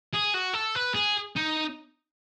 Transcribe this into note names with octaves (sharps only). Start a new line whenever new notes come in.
G#4
F#4
A4
B4
G#4
D#4